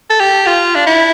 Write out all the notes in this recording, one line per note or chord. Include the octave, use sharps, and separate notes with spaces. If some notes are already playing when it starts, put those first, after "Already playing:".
A4
G4
F4
D4
E4